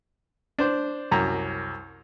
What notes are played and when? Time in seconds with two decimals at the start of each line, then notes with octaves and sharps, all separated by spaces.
0.59 D4 C5
1.11 C2 F#2 A#5